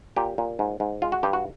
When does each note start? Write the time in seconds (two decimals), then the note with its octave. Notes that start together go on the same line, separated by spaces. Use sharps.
0.16 A#2 G4
0.38 A#2
0.59 G#2
0.80 G#2
1.02 G#3 F4
1.12 F#4
1.23 G2 G4
1.33 F#4